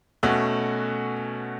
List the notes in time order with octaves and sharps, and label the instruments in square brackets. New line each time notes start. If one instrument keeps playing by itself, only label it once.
[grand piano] B2 A3 C#4 F#4